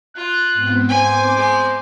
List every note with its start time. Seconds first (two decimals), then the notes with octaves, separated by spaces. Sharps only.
0.17 F4 F#6
0.53 G#2 B3 C4
0.89 C5 G#5 D6
1.36 G#3 G#5